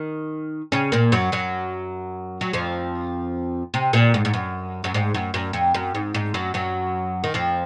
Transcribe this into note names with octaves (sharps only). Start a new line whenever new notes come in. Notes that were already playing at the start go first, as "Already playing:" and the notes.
Already playing: D#3
C#3 C#4
A#2 A#3
F#2 F#3
F#2 F#3
F#3
F2 F3
C3
A#2
G#2
G#2
F#2
F#2
G#2
F#2
F#2
F2
F#2
G#2
G#2
F#2 F#3
F#2 F#3
D#3
F2 F3